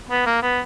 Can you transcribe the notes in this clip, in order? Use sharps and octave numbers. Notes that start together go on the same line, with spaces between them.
B3
A#3
B3